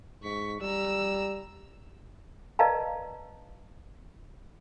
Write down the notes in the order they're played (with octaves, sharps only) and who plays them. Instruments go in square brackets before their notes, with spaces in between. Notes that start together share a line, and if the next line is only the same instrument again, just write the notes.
[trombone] G#2 [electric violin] C#6 B6
[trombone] G3 [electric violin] A#5 E6
[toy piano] B4 D5 D#5 F5 A5 A#5